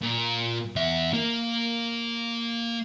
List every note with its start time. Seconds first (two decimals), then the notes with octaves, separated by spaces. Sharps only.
0.02 A#2
0.76 E2 E5
1.13 A#3